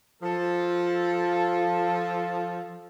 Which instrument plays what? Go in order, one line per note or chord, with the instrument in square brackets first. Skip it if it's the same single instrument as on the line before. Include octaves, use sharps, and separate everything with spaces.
[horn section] F3 A4